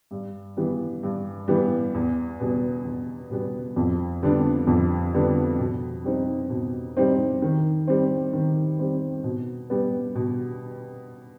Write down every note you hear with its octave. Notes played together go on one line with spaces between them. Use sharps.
G2
E3 G3 B3
G2
E3 G3 B3
E2
B2 G3 B3
E2
B2 G3 B3
F2
D3 G3 B3 D4
F2
D3 G3 B3 D4
B2
G3 C4 D#4
B2
G3 C4 D#4
D#3
G3 C4
D#3
G3 C4
B2
G3 B3
B2